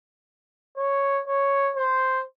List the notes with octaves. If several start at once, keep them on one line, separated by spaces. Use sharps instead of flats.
C#5
C#5
C5